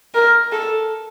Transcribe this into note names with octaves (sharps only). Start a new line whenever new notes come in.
A#4
A4